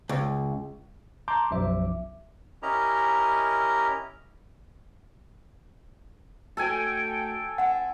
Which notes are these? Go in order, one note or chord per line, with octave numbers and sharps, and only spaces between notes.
C#2
A5 A#5 C6 D6 G6
B1 F#2 F3 E5 D6
C#4 E4 G4 A#4 D#5 A#5
A3 D4 F#4 A4 G5 G#5
C4 E4 F#5